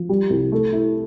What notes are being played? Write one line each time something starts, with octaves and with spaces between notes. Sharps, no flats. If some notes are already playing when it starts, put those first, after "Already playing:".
Already playing: F3
G3
C2
A3
E4